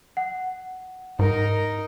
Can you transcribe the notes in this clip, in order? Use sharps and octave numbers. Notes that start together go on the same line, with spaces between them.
F#5
G#2 D#4 A#4